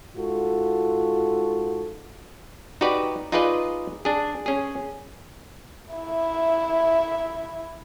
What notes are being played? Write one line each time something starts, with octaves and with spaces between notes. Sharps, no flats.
G#2 F4 F#4 A4
D#4 F#4 G4 B4 D5
D#4 F4 G#4 B4 D5 D#5
D4 G#4
C#4 G#4
E4 E5